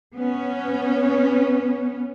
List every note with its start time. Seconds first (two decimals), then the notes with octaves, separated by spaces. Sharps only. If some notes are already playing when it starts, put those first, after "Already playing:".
0.14 B3 C#4